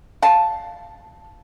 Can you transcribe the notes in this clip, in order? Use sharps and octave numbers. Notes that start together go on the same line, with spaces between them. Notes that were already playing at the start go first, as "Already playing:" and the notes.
F5 A5